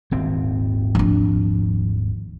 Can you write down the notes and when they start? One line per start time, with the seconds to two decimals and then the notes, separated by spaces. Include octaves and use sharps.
0.11 D#1 G#1 C4
0.95 F3 D4